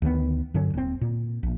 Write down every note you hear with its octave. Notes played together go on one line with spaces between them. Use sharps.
D2 D#3 F3 B3
G2 D3 F#3 C#4
D#1 C4
A#2
A#1